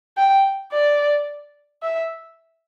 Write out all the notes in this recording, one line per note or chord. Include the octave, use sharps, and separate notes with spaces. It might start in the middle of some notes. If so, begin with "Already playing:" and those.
G5
D5
E5